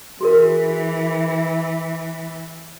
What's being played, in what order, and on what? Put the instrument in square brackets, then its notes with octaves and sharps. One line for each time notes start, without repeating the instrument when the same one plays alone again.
[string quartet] E3 [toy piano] F#4 G#4 A#4